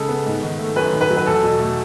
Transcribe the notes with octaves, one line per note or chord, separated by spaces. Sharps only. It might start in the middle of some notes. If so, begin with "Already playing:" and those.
Already playing: C#3 G#3 A4
B3
G#2
D#3
A3
F#2 B4
D#3
B4
F#3
B4
E2 A4
B2
A3